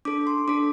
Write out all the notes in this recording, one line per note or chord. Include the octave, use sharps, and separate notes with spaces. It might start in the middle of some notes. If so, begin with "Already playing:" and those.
D4 A4 D6
C6
D4 A4 D6